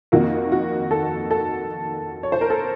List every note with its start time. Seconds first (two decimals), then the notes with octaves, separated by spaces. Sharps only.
0.12 F2 D#3 A#3 F#4
0.52 F#4
0.91 A4
1.31 A4
2.23 C#5
2.32 C5
2.41 A#4
2.50 A4